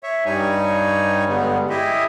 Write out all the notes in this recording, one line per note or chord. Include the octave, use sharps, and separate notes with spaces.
C#5 E5
G2 G3 D#4 C#5 G#5
G2 D3 G3 G#3 B3
E4 G4 G#4 D#5 E5